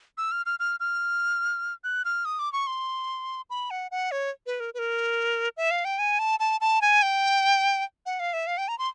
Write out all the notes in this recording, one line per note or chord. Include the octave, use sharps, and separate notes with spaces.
E6
F6
F6
F6
F6
F#6
F6
D#6
D6
C#6
C6
B5
F#5
F#5
C#5
B4
A#4
B4
A#4
E5
F5
G5
G#5
A5
A5
A5
G#5
G5
F#5
F5
E5
F5
G5
A#5
C6